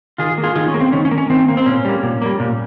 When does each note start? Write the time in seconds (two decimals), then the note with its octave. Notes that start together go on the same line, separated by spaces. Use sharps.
0.18 D#3 F4 G#4
0.38 A#3
0.44 F4 G#4
0.56 D#3 F4 G#4
0.68 C#4
0.74 A#3
0.80 C4
0.93 D#3 C#4
1.05 C#4
1.11 A#3
1.18 C#4
1.30 D#3 C4
1.48 A#3
1.57 C4
1.66 A#2 C#4
1.85 G3 A#3
2.03 A#2
2.22 G3 A#3
2.40 A#2